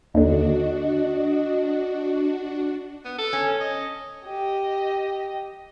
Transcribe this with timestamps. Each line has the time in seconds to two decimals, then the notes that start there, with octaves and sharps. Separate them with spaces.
0.14 D#2 D3 D4 F#4 D#5
3.05 B3
3.18 A4
3.33 C#4
3.61 D#5
4.26 G4 D#5